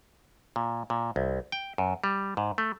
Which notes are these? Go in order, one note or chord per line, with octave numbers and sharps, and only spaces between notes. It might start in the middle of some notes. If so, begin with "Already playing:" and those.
A#2
A#2
C2
G5
F#2
G3
G#2
A3